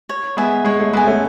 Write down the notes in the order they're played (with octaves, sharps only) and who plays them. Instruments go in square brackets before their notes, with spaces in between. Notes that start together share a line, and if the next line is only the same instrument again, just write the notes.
[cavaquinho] C#5
[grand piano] G#3 B3 [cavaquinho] E5 G#5
[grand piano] G#3 [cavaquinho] C#5
[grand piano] A3
[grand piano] G#3 B3 [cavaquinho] E5
[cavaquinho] G#5
[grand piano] A3 C#4